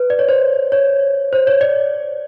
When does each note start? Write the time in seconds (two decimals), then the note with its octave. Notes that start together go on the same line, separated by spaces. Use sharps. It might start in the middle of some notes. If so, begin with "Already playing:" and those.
Already playing: B4
0.10 D5
0.19 C#5
0.29 C5
0.72 C#5
1.33 C5
1.47 C#5
1.61 D5